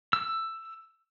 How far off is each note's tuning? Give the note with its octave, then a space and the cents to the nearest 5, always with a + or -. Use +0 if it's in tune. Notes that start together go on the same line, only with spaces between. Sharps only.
E6 +10